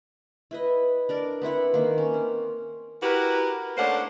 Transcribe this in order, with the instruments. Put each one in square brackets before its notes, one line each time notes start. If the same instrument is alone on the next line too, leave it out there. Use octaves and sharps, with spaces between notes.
[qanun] E4 B4 D#5
D4 A#4 D5
B3 C4 E4 F#5
D#3 A#3
C#4
C4
[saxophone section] E4 F#4 G4 A#4 B4
A3 A#3 C#4 D4 C5 F#5